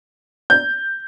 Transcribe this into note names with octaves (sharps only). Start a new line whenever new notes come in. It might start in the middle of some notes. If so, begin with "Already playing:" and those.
G6